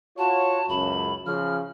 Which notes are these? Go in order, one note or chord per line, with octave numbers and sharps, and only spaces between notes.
F4 F#4 C#5 A5
C#2 F#2 B5
C#3 F3 F6